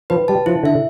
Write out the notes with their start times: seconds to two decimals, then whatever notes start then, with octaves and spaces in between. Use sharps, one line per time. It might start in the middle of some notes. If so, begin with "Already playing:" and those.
0.10 F3 B4
0.28 G3 A5
0.46 F3 E4
0.63 D3 E5